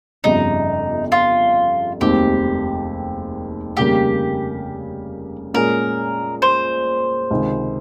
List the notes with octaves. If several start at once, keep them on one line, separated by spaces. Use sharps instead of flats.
G1 F2 C#3 G3 D#4
F4
F1 D#2 D#3 G#3 C4 G4
F1 D#2 C#3 G3 A#3 G4
A#2 G#3 C#4 G#4 A#4
C5
C#2 C3 D#3